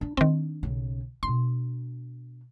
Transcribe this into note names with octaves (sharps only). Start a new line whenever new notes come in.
D4
D#3 C4 D4 D#4
B1 C#3
B2 D4 C6